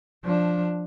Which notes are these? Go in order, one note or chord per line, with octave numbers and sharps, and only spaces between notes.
F3 D4